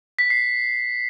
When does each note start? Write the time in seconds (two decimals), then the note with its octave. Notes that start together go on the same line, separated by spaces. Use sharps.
0.19 B6
0.30 C7